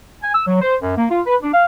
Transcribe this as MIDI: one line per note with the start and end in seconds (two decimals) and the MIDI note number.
0.22 0.31 80
0.35 0.43 88
0.47 0.58 54
0.61 0.75 72
0.80 0.96 42
0.97 1.06 58
1.10 1.21 65
1.26 1.35 71
1.42 1.52 62
1.53 1.65 77